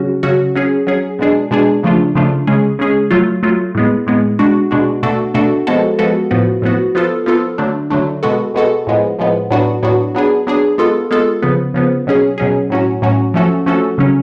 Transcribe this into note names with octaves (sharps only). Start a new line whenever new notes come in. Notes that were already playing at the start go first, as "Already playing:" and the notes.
Already playing: C#3 F#3 C#4 F#4
C#3 F#3 C#4 F#4
F#3 C#4 G#4
F#3 C#4 G#4
B2 G#3 D4 G#4
B2 G#3 D4 G#4
C#3 F3 A3 D4 F4
C#3 F3 A3 D4 F4
C#3 G#3 C#4 G#4
C#3 G#3 C#4 G#4
F#3 A3 F4
F#3 A3 F4
A2 G#3 B3
A2 G#3 B3
B2 G#3 D4 F#4
B2 G#3 D4 F#4
B2 A3 D4 F#4 A4
B2 A3 D4 F#4 A4
F3 G#3 B3 F#4 A4
F3 G#3 B3 F#4 A4
A2 F3 B3 F#4
A2 F3 B3 F#4
F3 B3 F4 A4
F3 B3 F4 A4
D3 F#3 A3 D4
D3 F#3 A3 D4
B2 G#3 B3 F#4 A4
B2 G#3 B3 F#4 A4
A2 F3 G#3 B3
A2 F3 G#3 B3
A2 F#3 B3 D4 F#4
A2 F#3 B3 D4 F#4
F#3 B3 D4 G#4
F#3 B3 D4 G#4
G#3 B3 F4 A4
G#3 B3 F4 A4
C#3 F3 B3
C#3 F3 B3
B2 F#3 C#4 G#4
B2 F#3 C#4 G#4
A2 F#3 C#4 F#4
A2 F#3 C#4 F#4
F3 A3 C#4 F#4 A4
F3 A3 C#4 F#4 A4
C#3 F#3 C#4